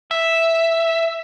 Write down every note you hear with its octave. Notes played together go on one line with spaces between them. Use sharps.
E5